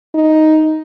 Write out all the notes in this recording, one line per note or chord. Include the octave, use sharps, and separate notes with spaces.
D#4